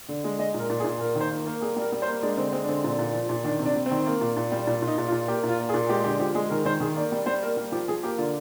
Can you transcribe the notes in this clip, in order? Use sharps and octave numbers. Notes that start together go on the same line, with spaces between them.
D3
G#3
G#3 D#5
A#2 A#4
A#2
G#4
A#2
A#3 A#4
D#3
C5
A#3
A#4
A#3
G3 G#4
G3
A#4
G3
C5
A#3
G#3 D4
D3 C4
G#3 C4
D4
D3 C4
A#2
A#2
F3
A#2
D#3 D4
C3
D4
G3
C4
D#3
A#3
A#2
A#2
G3
A#2
A#2
D#4
A#2
F4
A#2
A#3 G4
A#2
F4
A#3
G#4
A#2
G#3 G4
D3 G4
F3 G4
G#3 G#4
D#3 A#4
D#3 C5
D#3 G#4
A#3 D5
G3
G3 C5
A#3 A#4
G3 A#4
F3 G4
F3 G#4
A#3 G4
D3 F4